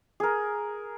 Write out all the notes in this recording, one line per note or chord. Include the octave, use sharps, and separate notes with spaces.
G#4 A#4